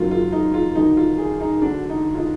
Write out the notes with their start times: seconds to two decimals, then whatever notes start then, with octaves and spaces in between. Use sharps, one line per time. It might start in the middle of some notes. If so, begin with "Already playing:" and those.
Already playing: F#1 F#2 D#3 F#3 F4
0.11 F4
0.32 D#4
0.54 F4
0.75 D#2 D3 F#3 D#4
0.97 F4
1.18 G#4
1.41 D#4
1.61 D2 D3 F#3 D4
1.90 D#4
2.15 F4
2.18 D#4